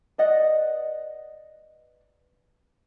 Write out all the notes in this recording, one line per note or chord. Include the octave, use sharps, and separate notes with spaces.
B4 D5 D#5 F#5